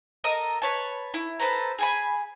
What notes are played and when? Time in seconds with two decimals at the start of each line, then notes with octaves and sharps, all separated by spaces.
0.24 A4 A#4 D#5 A#5
0.62 B4 C#5 A5
1.14 E4
1.40 A4 B4 C5 A#5
1.79 G#4 G#5 B5